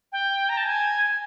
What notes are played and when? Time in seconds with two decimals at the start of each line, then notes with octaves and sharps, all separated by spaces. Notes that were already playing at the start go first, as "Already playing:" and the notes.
0.12 G5
0.49 A#5
0.57 A5
0.66 G#5